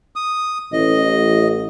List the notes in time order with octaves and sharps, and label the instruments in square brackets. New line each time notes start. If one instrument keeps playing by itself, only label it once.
[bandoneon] D#6
[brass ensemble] A1 [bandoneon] D#5